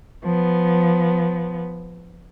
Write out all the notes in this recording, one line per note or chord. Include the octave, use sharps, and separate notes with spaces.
F3 B3